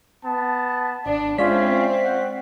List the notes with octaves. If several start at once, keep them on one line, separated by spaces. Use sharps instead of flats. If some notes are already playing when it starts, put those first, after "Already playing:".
B3 A5
G#1 D4
G#3 C4 C#4 F4 D5 E5 B6
F#5 G5